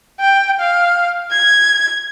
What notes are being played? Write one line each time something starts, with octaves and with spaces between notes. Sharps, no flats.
G5
F5
G#6